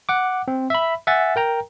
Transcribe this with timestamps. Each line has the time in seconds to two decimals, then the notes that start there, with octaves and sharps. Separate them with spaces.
0.09 F#5 D6
0.48 C4
0.70 E5 B5
1.07 E5 F#5 G#5 A6
1.36 A#4 G5 A#5